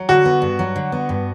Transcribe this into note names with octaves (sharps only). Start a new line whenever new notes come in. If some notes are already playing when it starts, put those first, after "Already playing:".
Already playing: F#3
D3 F#4
B3
G2
F#3
D3
B3
G2